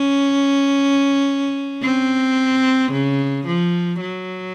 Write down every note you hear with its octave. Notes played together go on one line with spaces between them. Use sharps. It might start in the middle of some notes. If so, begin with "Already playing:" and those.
Already playing: C#4
C4
C#3
F3
F#3